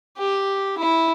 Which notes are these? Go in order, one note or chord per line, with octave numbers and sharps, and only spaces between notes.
G4
E4